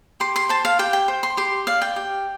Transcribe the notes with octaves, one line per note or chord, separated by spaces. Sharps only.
G4 C6
C6
C5 A5
F5
G4 G5
G5
C5
C6
G4 C6
D5 F5
G5
G4